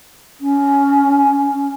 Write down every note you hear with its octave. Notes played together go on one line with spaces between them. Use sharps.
C#4